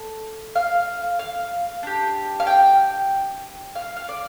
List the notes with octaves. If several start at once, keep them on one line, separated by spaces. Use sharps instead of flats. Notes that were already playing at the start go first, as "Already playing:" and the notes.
Already playing: A4
F5
F5
D4 G4
F5
G5
F5
F5
D5